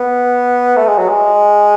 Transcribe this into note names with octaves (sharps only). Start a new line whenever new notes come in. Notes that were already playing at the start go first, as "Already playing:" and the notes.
Already playing: B3
A3
G#3
F#3
G#3